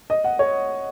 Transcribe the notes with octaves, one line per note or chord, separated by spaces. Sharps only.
D#5
F#5
C#5